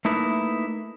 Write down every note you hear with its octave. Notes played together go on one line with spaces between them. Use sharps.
A3 A#3 D#4 E4 B4